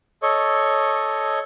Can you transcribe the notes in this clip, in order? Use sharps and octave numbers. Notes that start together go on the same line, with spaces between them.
A4 C#5 D#5 C#6